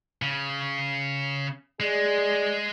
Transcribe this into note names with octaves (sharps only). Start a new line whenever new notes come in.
C#3
G#3 G#4 D5